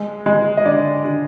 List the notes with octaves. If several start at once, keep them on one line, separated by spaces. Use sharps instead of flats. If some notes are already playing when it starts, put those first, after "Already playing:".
Already playing: G#3
G#3
D#5
D3 D5
D3